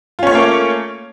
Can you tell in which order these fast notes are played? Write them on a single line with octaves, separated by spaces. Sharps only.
F4 C#4 C#5 A3 A#3